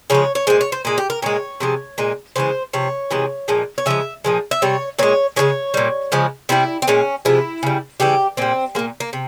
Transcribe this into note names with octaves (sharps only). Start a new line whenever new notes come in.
C#3 F3 G#3 C#5
C#5
A#2 G#3 C5
C#5
C5
A#2 G#3
G4
A#4
A#2 G#3 C#5
C3 F3 G#3
A#2 G#3
C#3 E3 G#3 C5
C3 F3 C#5
C3 E3 G#3
A#2 F3 G#3
C#5
C#3 F3 G#3 E5
A#2 F3 G#3
E5
C3 G3 C#5
A#2 G#3 C#5
C#3 F3 G#3 C#5
A#2 G3
C#3 F3 G#3
C3 G3 E4
C4
A#2 G#3 C#4
C3 F3 G#3 E4
C#3 G3
C#3 E3 G3 G4
A#2 G3 C4
A#2 G#3 A#3
A#3
C3